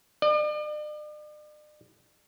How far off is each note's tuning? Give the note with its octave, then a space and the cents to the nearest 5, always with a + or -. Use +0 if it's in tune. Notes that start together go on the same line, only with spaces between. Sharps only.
D5 +45